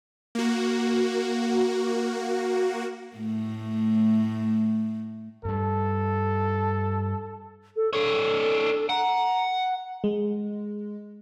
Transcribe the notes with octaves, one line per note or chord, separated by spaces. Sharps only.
A#3 F#4
A2 A3
G2 G3 A4
A4
D4 A4 C#5
F#5 A#5
G#3